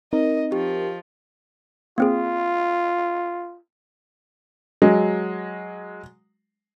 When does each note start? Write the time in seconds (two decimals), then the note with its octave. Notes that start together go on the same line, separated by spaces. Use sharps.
0.13 C4 D#4 A#4 D#5
0.52 F3 G4
1.98 A#3 C4 F4 G#4
4.82 F#3 G#3